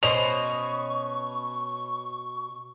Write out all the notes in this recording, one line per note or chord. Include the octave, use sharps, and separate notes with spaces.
B2 C#4 C5 D#5 C#6 F7